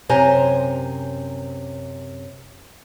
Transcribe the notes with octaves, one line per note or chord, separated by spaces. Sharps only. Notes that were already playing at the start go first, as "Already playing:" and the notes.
F#2 C3 C5 G#5 A#5